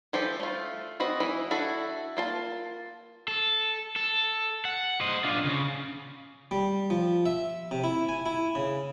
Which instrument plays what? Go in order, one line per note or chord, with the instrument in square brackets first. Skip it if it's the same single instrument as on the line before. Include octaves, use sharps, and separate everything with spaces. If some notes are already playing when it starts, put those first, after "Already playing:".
[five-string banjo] E3 F3 G4 A4
A3 F4
C4 F#4 B4 D#5
E3 E4
D4 E4 F#4 A4
A#3 F4 A5
[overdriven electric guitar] A4
A4
F#5
C5 D#5
D4 F4
C#3
[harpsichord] G3
F3
E5
C3
E4
G#5
E4
C#3